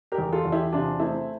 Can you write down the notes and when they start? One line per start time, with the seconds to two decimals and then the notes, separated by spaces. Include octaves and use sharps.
0.12 G4 A#4
0.18 E2
0.32 F4 A4
0.45 E2
0.52 E4 G4
0.73 C3 D4 F4
1.00 A3 C4 E4